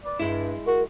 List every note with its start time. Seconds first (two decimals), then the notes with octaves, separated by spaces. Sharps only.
0.04 B4 D5
0.19 G2 G#3 E4
0.66 F#4 A#4